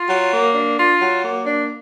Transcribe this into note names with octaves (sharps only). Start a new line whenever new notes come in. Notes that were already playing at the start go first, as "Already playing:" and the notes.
Already playing: F4
F#3
A#3
D4
F4
F#3
A#3
D4